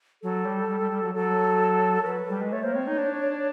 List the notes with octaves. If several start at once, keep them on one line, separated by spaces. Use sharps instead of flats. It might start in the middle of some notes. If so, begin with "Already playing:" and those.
F#3 A4
G3
G3
G3
G3
F#3
F#3 A4
A#4
F#3 B4
G3
G#3
A3 C#5
A#3 C5
C4 C#5
D#4
D4